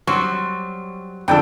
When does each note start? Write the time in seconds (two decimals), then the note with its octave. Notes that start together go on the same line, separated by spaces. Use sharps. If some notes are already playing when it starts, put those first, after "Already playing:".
0.07 F#3 G3 C4 C#6
1.28 F2 D3 F3 B3 A4 D5 G5